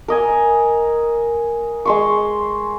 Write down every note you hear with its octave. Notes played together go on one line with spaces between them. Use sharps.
A#4 D#5 G#5
G#3 C6 C#6